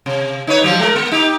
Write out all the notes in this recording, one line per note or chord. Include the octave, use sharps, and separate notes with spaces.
C3
D#4 B4 C#5
F3 F#3 G4
G#3 A#4
A#3
D#4 G4